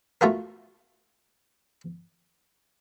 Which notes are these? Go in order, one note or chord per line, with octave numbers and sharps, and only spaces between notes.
A3 F4 F#4 A#4